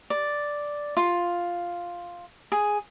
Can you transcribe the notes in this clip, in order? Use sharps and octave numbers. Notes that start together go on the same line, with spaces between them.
D5
F4
G#4